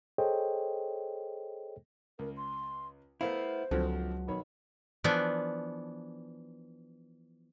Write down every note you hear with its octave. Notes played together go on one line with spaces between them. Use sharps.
G#4 A4 C5 C#5 D#5 G5
C#2 A#4
C6
A3 B3 E4 A#4 C5 F5
C#2 D3 F3 F#3 C4
B1 D#3 C#5 B5
E3 F3 B3 D4